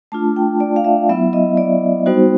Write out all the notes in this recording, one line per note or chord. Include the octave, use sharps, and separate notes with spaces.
A3 D4 F4 A5
G5
D5
F5
E5
F#3 B3 E4 E5
D#5
D5
G3 B3 D#4 F#4 C5